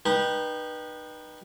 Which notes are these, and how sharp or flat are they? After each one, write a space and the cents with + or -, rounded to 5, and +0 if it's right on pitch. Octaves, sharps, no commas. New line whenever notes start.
D#4 -35 B4 -25 G5 +0